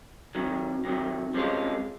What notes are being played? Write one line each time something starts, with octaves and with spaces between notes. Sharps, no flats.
C3 D#3 F#3
C3 D#3 F#3
C3 F3 G#3 C#4 F4